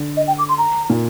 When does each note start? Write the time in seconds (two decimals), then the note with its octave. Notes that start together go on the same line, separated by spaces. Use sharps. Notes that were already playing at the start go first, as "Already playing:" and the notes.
Already playing: D3
0.17 D#5
0.28 G5
0.38 D6
0.49 C6
0.58 A#5
0.90 A#2